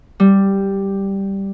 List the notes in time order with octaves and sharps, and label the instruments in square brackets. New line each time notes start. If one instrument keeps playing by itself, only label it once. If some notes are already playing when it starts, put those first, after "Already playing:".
[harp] G3